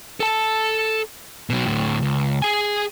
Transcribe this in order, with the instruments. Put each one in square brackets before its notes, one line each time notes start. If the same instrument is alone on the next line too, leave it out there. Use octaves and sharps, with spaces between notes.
[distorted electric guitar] A4 A5
B2 F#3
D2 A2
C#2
G#4 G#5